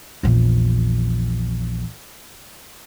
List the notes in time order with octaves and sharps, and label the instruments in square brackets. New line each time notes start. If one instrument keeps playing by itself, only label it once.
[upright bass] A#1 E2